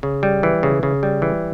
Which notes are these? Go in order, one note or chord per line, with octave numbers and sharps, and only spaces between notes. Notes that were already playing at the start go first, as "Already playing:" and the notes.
C#3
G3
E3
C#3
C#3
G3
E3